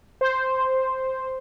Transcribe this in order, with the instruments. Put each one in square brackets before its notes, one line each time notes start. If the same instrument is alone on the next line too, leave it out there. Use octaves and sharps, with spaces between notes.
[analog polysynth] C5